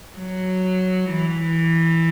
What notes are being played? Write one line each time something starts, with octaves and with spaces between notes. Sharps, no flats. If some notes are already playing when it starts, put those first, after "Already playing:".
F#3
E3